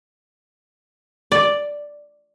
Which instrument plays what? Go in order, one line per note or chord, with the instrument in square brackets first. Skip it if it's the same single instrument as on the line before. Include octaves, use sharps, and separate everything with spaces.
[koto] D5